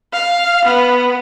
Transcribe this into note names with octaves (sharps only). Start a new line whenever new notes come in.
F5
B3